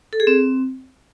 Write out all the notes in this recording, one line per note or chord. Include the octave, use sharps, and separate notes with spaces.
A4
G#4
C4